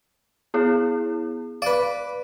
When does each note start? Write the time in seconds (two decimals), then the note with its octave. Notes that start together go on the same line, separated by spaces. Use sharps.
0.54 B3 E4 G#4
1.62 B4 D5 F5